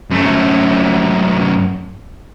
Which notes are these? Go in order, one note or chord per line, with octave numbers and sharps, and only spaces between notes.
F#2 A3